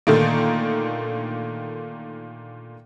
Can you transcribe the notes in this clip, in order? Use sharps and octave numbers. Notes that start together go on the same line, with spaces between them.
A#2 D3 D#3 A3 A#3